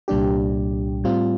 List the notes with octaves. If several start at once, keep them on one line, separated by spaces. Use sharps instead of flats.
C2 A#2 G3 D4 G4
A2 G3 C4 F4